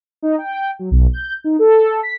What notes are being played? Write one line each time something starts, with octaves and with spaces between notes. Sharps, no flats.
D#4
G5
F#3
B1
G6
D#4
A4
B6